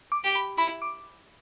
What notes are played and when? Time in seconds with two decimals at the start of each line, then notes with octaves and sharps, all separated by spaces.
0.12 D6
0.24 G4
0.35 B5
0.58 E4 B5
0.82 D6